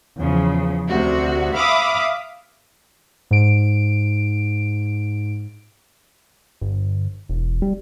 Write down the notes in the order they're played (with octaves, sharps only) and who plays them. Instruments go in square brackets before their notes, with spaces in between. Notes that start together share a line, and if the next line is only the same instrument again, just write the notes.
[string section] E2 C#3 F3
D2 C3 F#4
E5 F5 B5 D6 D#6
[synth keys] G#2 D7
[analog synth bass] G1
E1
G3